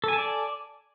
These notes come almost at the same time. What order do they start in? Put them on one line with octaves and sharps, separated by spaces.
A4 G#5 A5 D5